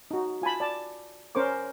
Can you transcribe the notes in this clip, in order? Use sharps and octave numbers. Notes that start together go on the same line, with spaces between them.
D#4 F#4
F4 G#5 A5 B5
D5 A5
C#4 A#4 C5 C#6 D6